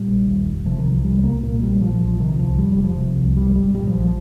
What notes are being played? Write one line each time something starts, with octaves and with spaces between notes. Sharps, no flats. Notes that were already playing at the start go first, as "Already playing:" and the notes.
Already playing: A#2 G3
A#1
D#2
F1
C3 F3
D#3
C2
F3
C3 G3
C2 A#3
A#2 A#3
A#1 G3
A#2 F3
F3
A#1
F3
C3 D#3
C2 F3
F1 G3
G3
F1
F3
C3
C2
G2 G3
G1 G3
A#2 G3
F3
A#1
F3